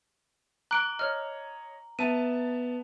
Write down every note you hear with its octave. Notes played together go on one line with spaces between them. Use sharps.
A#5 F#6 D7
C#5 D#5 F6
B3 E5 A5 D#7